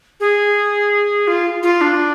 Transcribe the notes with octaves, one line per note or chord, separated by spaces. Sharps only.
G#4
F4
F4
D4